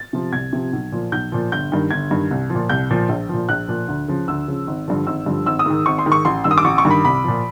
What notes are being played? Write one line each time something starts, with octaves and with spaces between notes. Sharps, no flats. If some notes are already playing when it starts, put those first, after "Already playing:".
Already playing: A6
C3 F3
C2 G#6
C3 F3
B1
A#2 F3
B1 G6
A#2 F3
G1 G6
G2 D#3
G1 G#6
G2 D#3
C2
F3
A#2
C2 G6
A#2 F3
A#1
A#2 F3
A#1 F#6
A#2 F3
D2
C#3 F3
D2 E6
C#3 F3
G#1
G2 D3 F3
G#1 E6
G2 D3 F3
G#1 E6
D#6
G#2 D#3
G#1 C#6
C6
G#2 D#3
C#6
A1 C6
G2 D#3 E6
D#6
D6
A1 C#6
C#6
G2 D#3
B5
C2 B5
A#2 F3